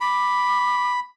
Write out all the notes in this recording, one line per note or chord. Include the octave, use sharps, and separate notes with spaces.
B5 D6